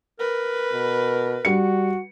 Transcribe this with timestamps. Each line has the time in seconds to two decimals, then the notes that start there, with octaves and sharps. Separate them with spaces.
0.20 A#4 B4
0.73 B2
1.45 G3 F#4 C#7